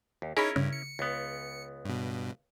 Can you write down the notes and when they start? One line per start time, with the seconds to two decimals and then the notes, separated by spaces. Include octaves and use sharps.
0.22 D#2
0.37 C#4 D#4 E4 G#4 A#4 C#5 A#5 B5
0.56 G2 C#3
0.73 C#7
0.99 C#2 B3
1.85 G2 B2